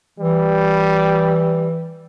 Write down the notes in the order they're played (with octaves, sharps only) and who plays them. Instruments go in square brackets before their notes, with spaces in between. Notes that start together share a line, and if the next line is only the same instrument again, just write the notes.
[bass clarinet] E3 [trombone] G3